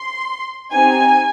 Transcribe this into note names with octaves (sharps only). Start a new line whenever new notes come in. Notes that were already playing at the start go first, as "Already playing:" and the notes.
Already playing: C6
C4 D#4 G4 G#5